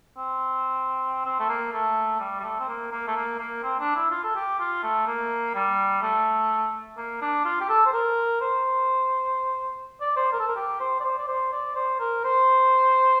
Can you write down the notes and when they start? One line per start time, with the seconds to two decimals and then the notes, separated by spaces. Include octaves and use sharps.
0.17 C4
1.25 C4
1.39 A3
1.49 A#3
1.72 A3
2.20 G3
2.40 G3
2.44 A3
2.60 C4
2.68 A#3
2.92 A#3
3.07 A3
3.16 A#3
3.40 A#3
3.63 C4
3.80 D4
3.96 E4
4.11 F4
4.24 A4
4.36 G4
4.59 F4
4.83 A3
5.07 A#3
5.55 G3
6.02 A3
6.98 A#3
7.21 D4
7.45 F4
7.61 G4
7.69 A4
7.86 C5
7.93 A#4
8.41 C5
10.01 D5
10.16 C5
10.33 A#4
10.39 A4
10.48 A#4
10.57 G4
10.80 C5
11.00 D5
11.04 C5
11.18 D5
11.28 C5
11.52 D5
11.75 C5
12.00 A#4
12.24 C5